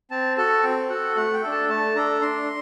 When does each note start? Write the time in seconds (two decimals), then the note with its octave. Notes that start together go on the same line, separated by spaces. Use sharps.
0.11 C4 A5
0.37 F#4 A4 A5
0.63 C4 G5
0.90 F#4 A4 F#5
1.16 A3 F#5
1.34 G5
1.43 D4 A4
1.52 A5
1.69 A3 A5
1.96 D4 A4 A#5
2.22 D4 C6